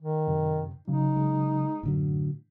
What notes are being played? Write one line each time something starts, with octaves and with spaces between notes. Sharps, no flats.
D#3
F#2 C3
C#3 F#3 D#4
G#3
F#2 A2 D3 F#3